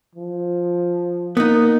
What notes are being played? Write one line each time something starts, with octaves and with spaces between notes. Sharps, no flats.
F3
A#3 B3 D#4